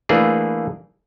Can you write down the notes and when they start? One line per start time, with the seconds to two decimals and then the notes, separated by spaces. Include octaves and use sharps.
0.09 E3 A3 A#3 D4 G#4 B4